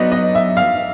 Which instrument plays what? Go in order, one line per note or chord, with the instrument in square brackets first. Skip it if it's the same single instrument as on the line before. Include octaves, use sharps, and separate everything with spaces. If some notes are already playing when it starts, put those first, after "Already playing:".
Already playing: [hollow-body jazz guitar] F#3 B3 D#4 [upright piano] D5 D#5
[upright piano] D#5
E5
F5